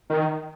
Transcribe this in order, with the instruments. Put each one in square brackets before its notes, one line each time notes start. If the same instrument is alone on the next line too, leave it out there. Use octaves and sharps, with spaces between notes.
[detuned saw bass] D#3